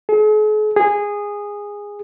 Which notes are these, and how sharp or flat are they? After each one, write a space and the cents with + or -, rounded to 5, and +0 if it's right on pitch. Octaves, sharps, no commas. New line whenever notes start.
G#4 +45
G#4 -15